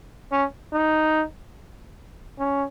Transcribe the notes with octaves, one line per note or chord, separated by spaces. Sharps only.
C#4
D#4
C#4